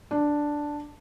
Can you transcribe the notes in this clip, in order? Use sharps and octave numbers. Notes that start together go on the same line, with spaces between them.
D4